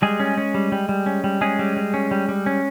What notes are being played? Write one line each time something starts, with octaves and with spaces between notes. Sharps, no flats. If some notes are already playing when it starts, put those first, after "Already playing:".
G3 G#3 G#4
C#4
C#4
G3
G3
G3
C#4
G3
G#3 C#4 G#4
G3
G3
C#4
G3
G3
C#4